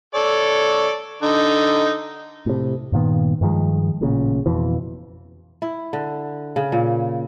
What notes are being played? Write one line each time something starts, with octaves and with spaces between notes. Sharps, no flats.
A4 C#5 D5
D3 D#4
A2 C3
G2 A#2 D#3 B3
G2 D#3 F3 G#3
A1 A#2 C#3
F2 B2 E3
E4
D3
C#3
A#2